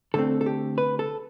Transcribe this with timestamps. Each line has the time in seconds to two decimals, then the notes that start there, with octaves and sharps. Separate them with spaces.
0.14 D3 A3 C4 A4
0.41 A4
0.46 G4
0.78 B4
0.99 A4